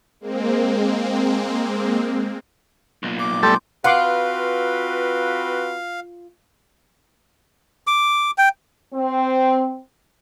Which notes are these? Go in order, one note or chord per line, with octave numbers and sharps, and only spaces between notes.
G#3 A#3 C4
B1 A#2
D6
G3 A3 A4 C6 G6
C4 F4 F#4 B4 F5 F#5 C6 D6
D6
G5
C4